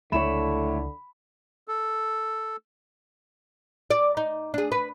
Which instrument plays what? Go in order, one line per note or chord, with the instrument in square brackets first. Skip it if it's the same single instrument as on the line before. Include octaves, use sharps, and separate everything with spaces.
[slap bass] C#2 F#3 [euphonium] D3 [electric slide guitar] A3 E4 C#5 [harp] B5 E7
[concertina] A4
[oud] D5
D#4
D4 G#4
B4